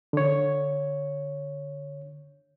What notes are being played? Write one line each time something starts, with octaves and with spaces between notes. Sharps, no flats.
D3 C#5